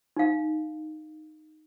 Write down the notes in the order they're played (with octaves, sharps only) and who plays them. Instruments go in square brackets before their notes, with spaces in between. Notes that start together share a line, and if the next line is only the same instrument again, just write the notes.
[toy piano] D#4 F5